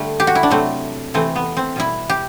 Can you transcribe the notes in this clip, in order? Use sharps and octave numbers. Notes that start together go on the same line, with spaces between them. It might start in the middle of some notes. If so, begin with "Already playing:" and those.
Already playing: D3 G3 A3
G4
F#4
E4
D4
C3 F#3 A3 C4
C3 E3 A3 C4
B3
C4
B2 G3 E4
G4